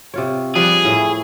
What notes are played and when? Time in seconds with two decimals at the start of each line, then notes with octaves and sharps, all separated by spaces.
0.14 C3 F4 C#5
0.55 F3 G3 G#4 B4
0.85 A2 E4